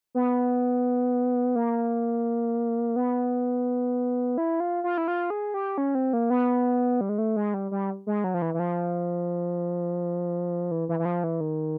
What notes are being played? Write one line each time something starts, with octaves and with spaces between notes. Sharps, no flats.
B3
A#3
B3
E4
F4
F4
E4
F4
G#4
G4
C#4
C4
A#3
B3
G3
G#3
A3
G#3
G3
G3
G#3
F#3
F3
E3
E3
F3
E3
E3
E3
F3
E3
D#3